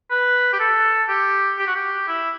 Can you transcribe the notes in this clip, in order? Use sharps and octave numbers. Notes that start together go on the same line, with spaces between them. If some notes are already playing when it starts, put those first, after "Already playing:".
B4
G4
A4
G4
G4
F#4
G4
E4